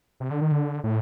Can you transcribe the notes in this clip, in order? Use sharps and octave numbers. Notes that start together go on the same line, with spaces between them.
C3
D3
D#3
D3
A2